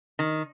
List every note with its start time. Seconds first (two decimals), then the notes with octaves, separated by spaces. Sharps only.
0.19 D#3